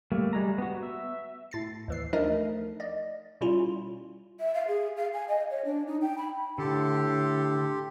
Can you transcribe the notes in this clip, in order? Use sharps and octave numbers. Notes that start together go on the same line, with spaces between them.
G3 A3 A#3
G3 G#3 A#5
B3 F#4
E5
A2 A6 C7
D#2 E3 C7
F3 A3 D4 D#4 A#4 D#5
D5 D#5
B2 G3 C#4 E4 F4
E5
F5
G#4
F5
G#5
D#5
C#5
D4
D#4
G5
B5
A2 D3 G4 A4 C6